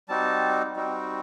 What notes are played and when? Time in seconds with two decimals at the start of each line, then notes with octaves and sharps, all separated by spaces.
0.09 G3 C4 D#4 F#4 A5
0.76 G3 C4 D#4 F#4